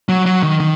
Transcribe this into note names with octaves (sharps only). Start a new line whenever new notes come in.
F#3
F#3
D#3
D#3